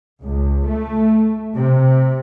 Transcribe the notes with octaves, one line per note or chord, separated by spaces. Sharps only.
C#2
A3
C3